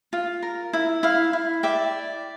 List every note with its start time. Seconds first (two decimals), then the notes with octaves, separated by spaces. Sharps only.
0.13 F4
0.43 A#4
0.73 E4
1.03 E4 F5
1.33 E4
1.63 D5 E5 G5